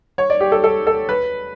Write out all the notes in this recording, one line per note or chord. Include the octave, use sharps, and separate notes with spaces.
C#5
D5
G4
A4
A4
A4
B4